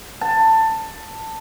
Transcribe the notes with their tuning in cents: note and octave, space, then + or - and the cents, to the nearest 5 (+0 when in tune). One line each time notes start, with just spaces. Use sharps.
A5 +15